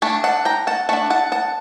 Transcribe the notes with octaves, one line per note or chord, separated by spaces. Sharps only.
A3 D4 A5
F#5 A5
G5 A#5
F#5 A5
A3 D4 F#5 A5
F#5 A5
F#5 A5